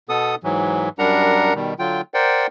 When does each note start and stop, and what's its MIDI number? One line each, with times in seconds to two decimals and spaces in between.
0.09 0.35 47
0.09 0.35 59
0.09 0.35 69
0.09 0.35 87
0.43 0.89 44
0.43 0.89 52
0.43 0.89 54
0.99 1.54 42
0.99 1.54 55
0.99 1.54 62
0.99 1.54 70
0.99 1.54 78
0.99 1.54 82
1.55 1.74 47
1.55 1.74 51
1.55 1.74 55
1.79 2.01 50
1.79 2.01 54
1.79 2.01 65
1.79 2.01 79
2.14 2.47 70
2.14 2.47 72
2.14 2.47 74
2.14 2.47 78
2.14 2.47 79